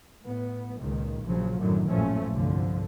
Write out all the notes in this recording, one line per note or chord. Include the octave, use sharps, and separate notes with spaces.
A2 B3
C#2 A#2 D#3
A#1 C#3 F3 F#3
F#2 A2 D3 D#3 F#3
A1 F#2 A#2 F3 A3 C#4
G1 C2 F2 D3 F3